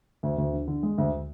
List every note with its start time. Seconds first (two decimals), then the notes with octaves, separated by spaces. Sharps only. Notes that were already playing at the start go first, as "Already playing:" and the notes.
0.23 D2
0.38 D2
0.53 D3
0.68 D3
0.83 G#3
0.98 D2